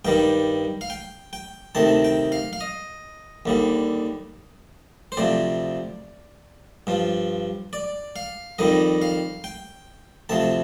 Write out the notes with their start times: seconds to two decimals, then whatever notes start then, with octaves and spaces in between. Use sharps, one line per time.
0.05 G2 D#3 G3 G5
0.81 F5
0.90 G5
1.33 G5
1.75 D2 C3 D#3 A5
2.04 G5
2.32 F5
2.53 F5
2.61 D#5
3.46 D#2 D3 G3
5.12 C5
5.17 D2 C3 F3 D5
6.87 G2 F3
7.73 D5
8.16 F5
8.59 F2 D#3 G3 D#5
9.02 F5
9.44 G5
10.29 D2 C3 F3 A5